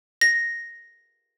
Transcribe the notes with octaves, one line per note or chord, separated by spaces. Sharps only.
A#6